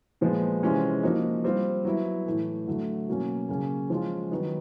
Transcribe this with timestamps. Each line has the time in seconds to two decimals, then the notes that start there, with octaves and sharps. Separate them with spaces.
0.21 A#2 F3 G#3 B3
0.62 C3 E3 G#3 C#4 F4
1.03 F3 A#3 D#4 F#4
1.44 G3 C4 F4
1.85 F#3 B3 E4
2.26 A2 E3 A3
2.68 D3 F#3 A3
3.08 B2 F#3 A#3 C#4
3.49 C#3 F#3 A#3 C#4
3.90 F3 G#3 C#4 F4
4.31 D#3 F#3 B3 D#4